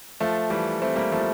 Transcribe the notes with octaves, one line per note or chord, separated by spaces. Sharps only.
F3 A3
E3 G3
A3 C4
G3 A#3
F3 A3